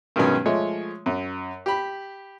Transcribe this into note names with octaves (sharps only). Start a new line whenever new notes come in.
G2 B2 D#3 F#3 G#3 C#4
F3 G#3 A3 C#5
F#2
G4 B5